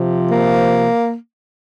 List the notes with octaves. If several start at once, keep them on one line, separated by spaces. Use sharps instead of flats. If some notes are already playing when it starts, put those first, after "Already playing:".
Already playing: C3 F3
A#3